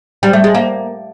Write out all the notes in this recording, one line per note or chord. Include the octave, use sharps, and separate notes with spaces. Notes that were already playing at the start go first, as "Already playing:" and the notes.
G3
A3
G#3
A#3